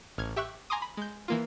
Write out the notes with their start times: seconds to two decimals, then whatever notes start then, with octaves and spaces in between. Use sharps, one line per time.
0.18 A1 F6 G#6
0.36 G4 E5 C#6 F#6
0.70 G#5 A#5 C6 D6 D#6
0.82 B5
0.97 G#3 G6
1.28 E3 A#3 F4